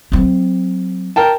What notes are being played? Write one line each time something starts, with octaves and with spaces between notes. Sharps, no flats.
F#3 C4
A#4 G5 A5